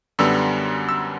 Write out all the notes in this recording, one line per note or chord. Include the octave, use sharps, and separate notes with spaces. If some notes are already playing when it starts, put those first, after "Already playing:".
F#2 D3 G3 B3 E6
E6